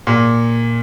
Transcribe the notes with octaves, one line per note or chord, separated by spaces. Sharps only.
A#2